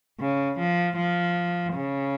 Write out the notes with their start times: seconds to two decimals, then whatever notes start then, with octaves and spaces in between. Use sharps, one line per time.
0.20 C#3
0.59 F3
0.97 F3
1.74 C#3